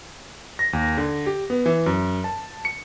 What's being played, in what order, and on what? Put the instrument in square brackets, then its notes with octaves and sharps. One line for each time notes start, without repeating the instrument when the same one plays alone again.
[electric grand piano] A#6
D#2
D3
G4
B3
E3
F#2
A5
C#7